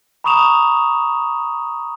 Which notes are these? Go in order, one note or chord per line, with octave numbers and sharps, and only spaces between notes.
A#5 B5 C#6 D#6 E7 F7